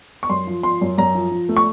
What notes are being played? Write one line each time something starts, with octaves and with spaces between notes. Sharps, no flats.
C#6
F#2 C6
F3
F3 C6
F#2
F#2 A#5
F3
F3
A3
C#6